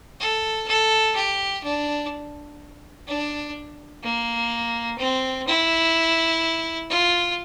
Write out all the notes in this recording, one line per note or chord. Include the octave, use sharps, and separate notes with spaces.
A4
A4
G4
D4
D4
A#3
C4
E4
F4